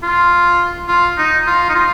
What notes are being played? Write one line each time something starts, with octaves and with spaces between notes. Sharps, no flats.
F4
F4
D#4
F4
D#4
F4